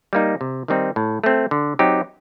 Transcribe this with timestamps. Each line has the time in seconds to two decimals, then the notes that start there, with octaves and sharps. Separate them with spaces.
0.13 G3 A#3 D#4
0.41 C3
0.68 D#3 G3 C4 D#4
0.96 A2
1.24 A3 C4
1.51 D3
1.79 F#3 C4 D#4 G4